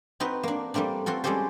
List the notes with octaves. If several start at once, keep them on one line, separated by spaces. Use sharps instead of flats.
C4 D#4 F#4 B4
A#3 D4
G3 A3 A#3 C4 D4
C4 F4 F#4 A4
G3 G#3 C#4 G4 A4 C5